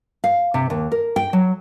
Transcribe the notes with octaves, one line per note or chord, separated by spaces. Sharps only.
F5
C3
D#2
A#4
G5
F#3